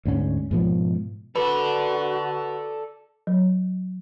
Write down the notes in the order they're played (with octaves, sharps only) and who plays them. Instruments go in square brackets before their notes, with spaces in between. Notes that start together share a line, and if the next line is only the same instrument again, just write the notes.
[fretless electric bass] D2 G#2 C#4
G#2 B2 F3
[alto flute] F#4 [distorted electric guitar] A4 D5 [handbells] B4 B5
[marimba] F#3